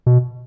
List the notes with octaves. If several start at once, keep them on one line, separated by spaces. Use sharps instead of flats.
B2